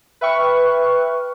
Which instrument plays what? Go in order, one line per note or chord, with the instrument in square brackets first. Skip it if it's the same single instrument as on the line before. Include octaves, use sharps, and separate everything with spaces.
[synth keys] B4 E5 G5 C#6 F6 F#6